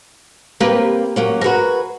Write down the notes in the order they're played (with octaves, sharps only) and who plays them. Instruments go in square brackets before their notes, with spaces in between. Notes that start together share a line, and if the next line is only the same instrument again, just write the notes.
[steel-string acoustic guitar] C3 A#3 [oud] G4 A#4 B4
[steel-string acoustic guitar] F#3 A#3 C#4
[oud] F#4 A#4 [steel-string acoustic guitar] G#4 B4